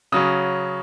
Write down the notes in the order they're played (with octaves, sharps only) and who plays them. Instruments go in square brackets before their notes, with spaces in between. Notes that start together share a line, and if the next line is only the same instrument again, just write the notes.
[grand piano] C#3 F#3 C#4 D#6